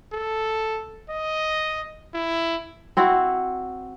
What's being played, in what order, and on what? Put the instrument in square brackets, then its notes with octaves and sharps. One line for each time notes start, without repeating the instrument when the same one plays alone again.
[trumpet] A4
D#5
E4
[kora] C4 E4 F#4